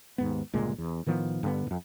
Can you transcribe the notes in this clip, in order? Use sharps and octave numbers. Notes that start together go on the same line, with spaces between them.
D#2 G#2 B3
G1 C#2 A#2 G#3
E2
A2 D#3 F3 B3
G2 D3 B3
F2 G#2